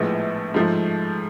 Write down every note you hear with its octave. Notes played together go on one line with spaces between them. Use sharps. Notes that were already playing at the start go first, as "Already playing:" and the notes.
Already playing: A#1 A2 F3 G#3 B3
G#2 F3 A3